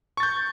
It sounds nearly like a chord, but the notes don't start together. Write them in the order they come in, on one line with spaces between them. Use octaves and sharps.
C#6 A6 G6